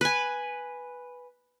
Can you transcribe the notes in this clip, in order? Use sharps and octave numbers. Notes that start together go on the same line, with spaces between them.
B4 G#5